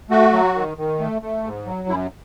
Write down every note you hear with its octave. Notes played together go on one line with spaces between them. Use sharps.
A3 F#4
F#3
D#3
D#3
A3
A3
G#2
F#3
F#2 E4